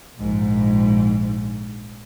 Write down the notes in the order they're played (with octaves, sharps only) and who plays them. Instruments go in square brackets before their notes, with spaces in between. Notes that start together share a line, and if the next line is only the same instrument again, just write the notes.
[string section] A#1 G#2